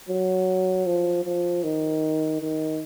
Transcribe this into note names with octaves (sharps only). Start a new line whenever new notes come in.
F#3
F3
F3
D#3
D#3